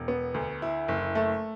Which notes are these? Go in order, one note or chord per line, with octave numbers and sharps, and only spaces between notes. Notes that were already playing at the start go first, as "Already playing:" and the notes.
Already playing: E1
B3
D2
E4
F#1
A3